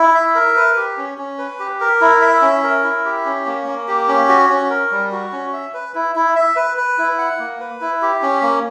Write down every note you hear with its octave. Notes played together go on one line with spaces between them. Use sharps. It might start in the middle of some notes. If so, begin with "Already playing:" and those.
Already playing: E4
E5
A#4
B4
G4
C#4
C#4
B4
G4
A#4
E4
E5
C#4
A#4
E4
G4
C#4
A#3
A#3
G4
C#4
F#4
C#4
A#4
G3
F#4
C#4
E5
B4
E4
E4
E5
B4
B4
E4
F#5
A#3
B4
E4
G4
C#4
A#3